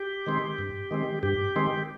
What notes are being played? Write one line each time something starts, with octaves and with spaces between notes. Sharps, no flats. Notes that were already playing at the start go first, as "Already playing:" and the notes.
Already playing: G4
D#3 G#3 C4
G2
D#3 G#3 C4
G2 G4
D#3 G#3 C4